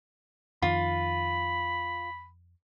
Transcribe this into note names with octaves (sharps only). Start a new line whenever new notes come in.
F2 D#3 F4 B5